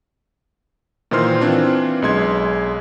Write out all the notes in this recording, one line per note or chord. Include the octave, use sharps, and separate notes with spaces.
A#2 D#3 E3 C5 C6 F6
E3 C4 D4 F4
B1 G#3 C6 G#6